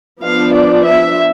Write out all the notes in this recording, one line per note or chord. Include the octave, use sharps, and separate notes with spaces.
F3 B3 D4 F5
D5
E5